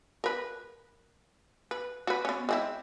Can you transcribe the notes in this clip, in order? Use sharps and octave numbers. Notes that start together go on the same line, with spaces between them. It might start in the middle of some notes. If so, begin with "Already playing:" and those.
A#4 B4
B4
F#4 B4
B3 C#4
G#3 C4 E4